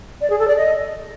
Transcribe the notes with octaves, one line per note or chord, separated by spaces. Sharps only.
D5
G#4
A4
D5
D#5